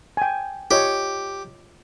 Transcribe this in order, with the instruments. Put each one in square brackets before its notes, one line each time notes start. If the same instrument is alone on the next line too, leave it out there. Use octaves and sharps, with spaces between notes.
[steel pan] G5 G#5
[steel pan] F4 C#5 D#5 [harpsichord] G4